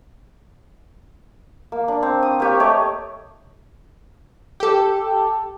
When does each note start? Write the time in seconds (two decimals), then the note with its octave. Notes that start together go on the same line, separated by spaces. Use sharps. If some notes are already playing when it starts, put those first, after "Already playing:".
1.72 A#3
1.88 D4
2.03 C4
2.23 D#6
2.40 A#3 G4 C#5
2.60 A3 C#5 D#5 D6
4.60 G4 A4